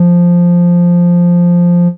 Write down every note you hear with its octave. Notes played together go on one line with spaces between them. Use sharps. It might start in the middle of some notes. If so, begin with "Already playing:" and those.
Already playing: F3